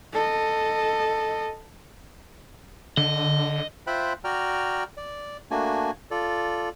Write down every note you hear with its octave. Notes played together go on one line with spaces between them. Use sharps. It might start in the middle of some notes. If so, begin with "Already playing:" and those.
A4 D#5
D3 D#5
F4 C5 E5 G5 B5 F#6
F#4 D5 G5 A#5 F6
D5
A3 A#3 D4 F#4 G#5
F4 A4 D5